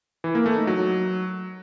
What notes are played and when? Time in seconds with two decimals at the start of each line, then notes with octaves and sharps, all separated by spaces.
0.24 E3
0.35 A#3
0.46 A3
0.56 D#4
0.67 F#3